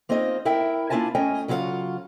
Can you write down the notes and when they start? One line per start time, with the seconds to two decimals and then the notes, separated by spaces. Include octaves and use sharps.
0.09 A#3 C4 D#4 F4 D#5
0.45 E4 A#4 E5 G5
0.90 A#3 D4 E4 F4 G#5 A5
1.15 A3 C#4 D#5 G5 G#5
1.48 C#3 F#3 F4 G4 F5 F#5